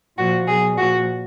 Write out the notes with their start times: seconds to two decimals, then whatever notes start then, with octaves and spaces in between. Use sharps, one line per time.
0.17 A#2 F3 F#4
0.47 B2 F#3 G#4
0.77 A#2 F3 F#4